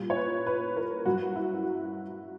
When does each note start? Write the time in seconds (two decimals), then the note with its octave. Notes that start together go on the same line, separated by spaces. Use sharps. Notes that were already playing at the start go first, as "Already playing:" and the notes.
Already playing: A#2 G3
0.10 C#5
0.16 B4
0.46 B4
0.76 A#4
1.05 G2 F#3 F#4
1.35 E4